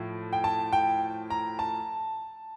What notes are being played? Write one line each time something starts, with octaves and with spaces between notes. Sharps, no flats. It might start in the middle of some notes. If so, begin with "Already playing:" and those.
Already playing: A2 F3
G5
A5
G5
A#5
A5